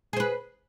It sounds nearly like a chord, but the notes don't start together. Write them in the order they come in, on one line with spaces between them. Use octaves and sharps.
G#4 C5 B4